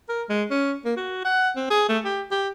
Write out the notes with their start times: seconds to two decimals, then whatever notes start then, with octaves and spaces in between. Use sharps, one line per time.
0.09 A#4
0.29 G#3
0.51 C#4
0.85 A#3
0.97 F#4
1.25 F#5
1.56 C4
1.70 G#4
1.89 A3
2.05 G4
2.31 G4